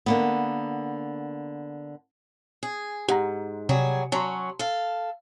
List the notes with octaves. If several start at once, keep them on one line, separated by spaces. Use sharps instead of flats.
D3 A#3 B3
G#4
G#2 G4 F#5 A#5
C3 F#3 G3 G#4
F#3 C#4 A5 A#5 C6
A4 F5